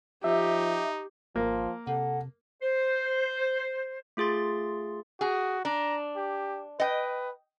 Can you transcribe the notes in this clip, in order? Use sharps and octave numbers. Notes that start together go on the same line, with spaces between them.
F3 D#4 G4 E5
G#1 F3 A#3
C3 A4 F#5
C5
A3 F4 G#4 C6 A6
F#4 G#4
D4 A#5
G4
B4 D#5 G5